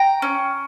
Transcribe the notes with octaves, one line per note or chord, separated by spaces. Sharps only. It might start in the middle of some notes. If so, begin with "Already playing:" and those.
Already playing: G5 A#5
C#4